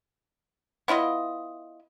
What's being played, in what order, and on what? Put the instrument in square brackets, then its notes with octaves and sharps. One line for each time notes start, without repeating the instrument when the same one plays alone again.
[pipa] B3 E4 F4 D#5